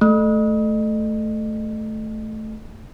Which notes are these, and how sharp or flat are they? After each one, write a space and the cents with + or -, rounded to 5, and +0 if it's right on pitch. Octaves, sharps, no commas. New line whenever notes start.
A3 -10